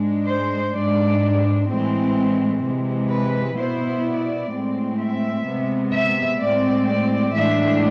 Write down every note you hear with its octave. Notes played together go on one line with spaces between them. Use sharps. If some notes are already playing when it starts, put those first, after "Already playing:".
Already playing: G#2 G#3 D4
C5
G#2 G#3 D4 D5
A2 E3 G#3 C4
C3 E3 G#3
B4
B2 B3 E4 C5
D5
A2 G#3 C4
E5
C3 G#3 B3
E5
A2 G#3 C4 D5
D5
A2 E3 G#3 D4 E5